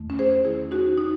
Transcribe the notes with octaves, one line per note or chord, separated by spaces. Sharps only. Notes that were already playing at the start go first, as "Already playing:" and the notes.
Already playing: E2 D#3 A3
C#4
G#4 C5
E2 D#3 A3 E4 G#4
D#4 F#4
D#4